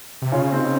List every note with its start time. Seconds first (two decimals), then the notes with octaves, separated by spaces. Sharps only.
0.22 C3
0.32 C#3 C#4 F4
0.52 C4 D#4